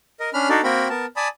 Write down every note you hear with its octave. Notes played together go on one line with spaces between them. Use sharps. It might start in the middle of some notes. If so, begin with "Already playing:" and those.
A#4 D#5
C#4 D4 B5 F6
D4 D#4 F#4 A4 D5
A#3 C4 F#4 A#4 G5 B5
B3 A#4 A5
D5 G#5 A5 B5 D#6